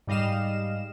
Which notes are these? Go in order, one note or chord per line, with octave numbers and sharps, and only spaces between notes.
G#2 G3 D#5 F5 E7